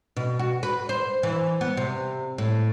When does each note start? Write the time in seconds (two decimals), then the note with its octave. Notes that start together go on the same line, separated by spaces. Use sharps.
0.16 B2
0.39 F#4
0.63 B4
0.89 C5
1.23 E3
1.61 B3
1.77 C3
2.38 A2